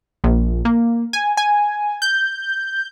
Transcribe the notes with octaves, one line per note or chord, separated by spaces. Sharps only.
A#1
A#3
G#5
G#5
G6